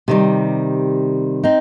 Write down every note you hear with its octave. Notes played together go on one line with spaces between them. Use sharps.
C3 D#3 G3
C4 D#4